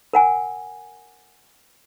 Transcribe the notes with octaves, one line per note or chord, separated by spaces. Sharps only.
A#4 F#5 G#5